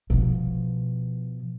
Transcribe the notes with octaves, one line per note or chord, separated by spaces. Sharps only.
B2 F3